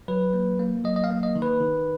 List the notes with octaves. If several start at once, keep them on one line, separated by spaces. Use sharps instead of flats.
F#3 B4
A#3
A#3
F#3 D#5
D#5
F5
A#3
D#5
D#3
B4
D#3